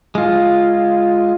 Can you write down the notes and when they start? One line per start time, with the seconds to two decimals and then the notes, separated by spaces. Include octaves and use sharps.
0.15 G#3 F4